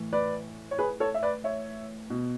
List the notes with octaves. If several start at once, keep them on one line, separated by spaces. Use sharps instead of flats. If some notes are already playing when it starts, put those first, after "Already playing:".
Already playing: A2 E3
B4 D5
C#5
G#4 B4
A4 C#5
E5
B4 D5
C#5 E5
B2